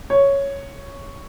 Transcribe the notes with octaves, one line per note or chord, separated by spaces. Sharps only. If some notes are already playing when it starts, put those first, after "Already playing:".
C#5